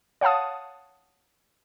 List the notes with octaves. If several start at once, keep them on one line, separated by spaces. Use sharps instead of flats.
C#5 F5 F#5 A5 D#6